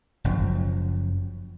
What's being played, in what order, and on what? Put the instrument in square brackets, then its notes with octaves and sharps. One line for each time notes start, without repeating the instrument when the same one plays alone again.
[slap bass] F#1 F#2 F3